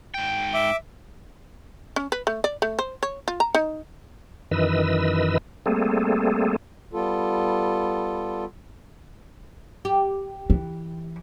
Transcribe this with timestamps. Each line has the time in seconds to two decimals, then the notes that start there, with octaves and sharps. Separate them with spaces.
0.14 G#2 G5
0.54 E5 D6
1.96 C#4
2.12 B4
2.27 A3
2.44 D5
2.62 A3
2.79 C5
3.03 C#5
3.28 F4
3.40 A#5
3.55 D#4
4.51 F#2 D#3 E3 B4 D#5 E6
5.66 G3 A3 A#3 C4 G#4 A4
6.93 G3 B3 F4 A4
9.85 G4
10.50 E3